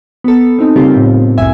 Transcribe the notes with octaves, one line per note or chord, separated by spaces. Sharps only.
B3 A4
C4 D#4
C#3 G3 A#3 C4 F4 G4
A2
G1 C2 F#2 E5 G#5